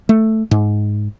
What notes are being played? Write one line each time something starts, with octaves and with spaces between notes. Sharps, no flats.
A3
G#2